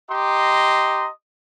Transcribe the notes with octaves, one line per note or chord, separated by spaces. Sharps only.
G4 D#5 A#5 C6